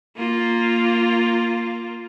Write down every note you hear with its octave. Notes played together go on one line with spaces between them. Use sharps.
A#3 F4